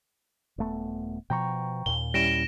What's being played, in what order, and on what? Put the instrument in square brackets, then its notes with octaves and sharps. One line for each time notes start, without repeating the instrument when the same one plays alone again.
[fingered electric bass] D#1 A3 B3
[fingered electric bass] B2 F3 [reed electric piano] G5 A#5 C#6
[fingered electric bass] D#2 A#2 [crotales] G7
[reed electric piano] G3 C#4 E4 [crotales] A#6 D7 E7